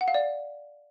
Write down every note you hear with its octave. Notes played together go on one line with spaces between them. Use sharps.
F#5
F5
D5